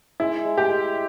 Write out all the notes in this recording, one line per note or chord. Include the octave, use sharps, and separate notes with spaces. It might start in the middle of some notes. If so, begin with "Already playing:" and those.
G#3 E4
G#3
G4
G#3